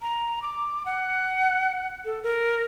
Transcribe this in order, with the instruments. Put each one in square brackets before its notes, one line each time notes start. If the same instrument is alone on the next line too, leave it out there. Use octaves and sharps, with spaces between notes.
[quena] A#5
D6
F#5
A4
A#4